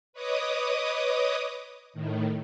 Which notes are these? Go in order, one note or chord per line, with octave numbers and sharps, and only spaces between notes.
B4 C#5 D#5 D6 D#6
A2 D#3